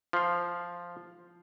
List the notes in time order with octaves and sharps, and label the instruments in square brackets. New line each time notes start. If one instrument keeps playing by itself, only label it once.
[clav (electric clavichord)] F3 F5